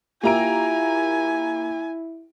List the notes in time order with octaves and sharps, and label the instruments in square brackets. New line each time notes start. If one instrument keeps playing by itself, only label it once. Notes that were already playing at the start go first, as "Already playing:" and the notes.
[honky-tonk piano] A#3 A#5 D7 [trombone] E4 [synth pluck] F4 G4 E5 [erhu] G#5